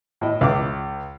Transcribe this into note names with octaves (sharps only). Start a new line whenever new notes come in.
A2 E4 D#5
C#2 D6